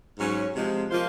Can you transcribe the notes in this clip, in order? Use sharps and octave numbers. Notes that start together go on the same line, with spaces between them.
G#2 F#3 C#4
C3 F3 G#3
F3 A#3 F4 C5